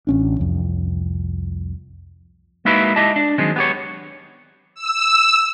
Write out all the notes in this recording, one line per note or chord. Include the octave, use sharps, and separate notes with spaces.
A1 C#4 D4
C2 F2
G#3 A#3 D#4 E4 F#4 B4
E4 G4 D#5 A5
D4
D#3 F#3 G#3 C4
B3 G4 C#5
E6